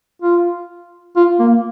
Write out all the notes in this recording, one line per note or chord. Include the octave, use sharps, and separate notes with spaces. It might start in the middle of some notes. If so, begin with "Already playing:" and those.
F4
F4
A#3